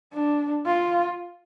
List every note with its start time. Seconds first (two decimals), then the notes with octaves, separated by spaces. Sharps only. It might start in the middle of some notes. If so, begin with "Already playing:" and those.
0.13 D4
0.66 F4